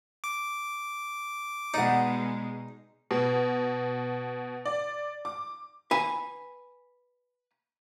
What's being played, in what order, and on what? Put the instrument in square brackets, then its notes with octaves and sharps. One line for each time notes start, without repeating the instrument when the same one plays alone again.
[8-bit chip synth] D6
[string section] B2 G#3 [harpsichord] D#4 [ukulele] D5 F#5
[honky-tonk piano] B2
D5
D6
[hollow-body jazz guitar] B4 G#5